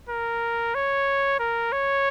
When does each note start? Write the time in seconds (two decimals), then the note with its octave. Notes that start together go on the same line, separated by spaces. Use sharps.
0.09 A#4
0.75 C#5
1.39 A#4
1.72 C#5